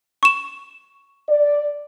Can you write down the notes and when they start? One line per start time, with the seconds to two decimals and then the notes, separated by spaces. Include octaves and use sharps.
0.23 C#6 E7
1.29 D5